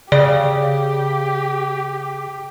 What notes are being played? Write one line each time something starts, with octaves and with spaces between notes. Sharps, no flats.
C#3 G4 D5